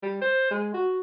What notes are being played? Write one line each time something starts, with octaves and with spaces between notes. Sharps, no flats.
G3
C5
G#3
F#4